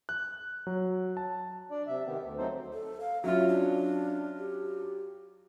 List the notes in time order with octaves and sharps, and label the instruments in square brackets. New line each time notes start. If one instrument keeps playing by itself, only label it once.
[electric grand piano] F#6
F#3
A5
[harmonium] D4 D5
C3 E5
D#3 B3 G4
D2
F#3 A3 C4 D#4 A4 C5
[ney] A4
F5
[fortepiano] F#3 C#4 F4 [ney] E5
[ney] D4
G4